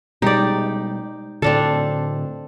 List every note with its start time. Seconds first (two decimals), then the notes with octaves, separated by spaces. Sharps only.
0.22 B2 G3 G#3 D#4 G4 D5
1.42 A2 D3 C4 D4 A4 F5